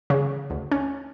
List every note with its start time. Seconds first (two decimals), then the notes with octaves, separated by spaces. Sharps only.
0.10 C#3
0.50 D2
0.72 C#4